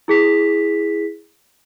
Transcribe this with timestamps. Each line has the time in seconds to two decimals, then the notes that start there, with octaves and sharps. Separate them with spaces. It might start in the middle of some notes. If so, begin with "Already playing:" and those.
0.08 E4 G#4 B6